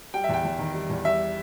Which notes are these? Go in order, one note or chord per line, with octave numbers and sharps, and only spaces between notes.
G3 G5
E5
E2 G5
E2
D#3
G3
E2
G3 E5